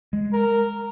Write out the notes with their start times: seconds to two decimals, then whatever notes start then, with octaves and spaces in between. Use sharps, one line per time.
0.13 G#3
0.33 A#4